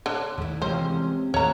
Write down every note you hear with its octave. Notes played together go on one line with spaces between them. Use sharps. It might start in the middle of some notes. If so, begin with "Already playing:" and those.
D3 D4 C#5
D#2 A3 E4
C3 E3 G#3 C#4 F4 C5
D#2 A3 E4 F#4 C#5 A#5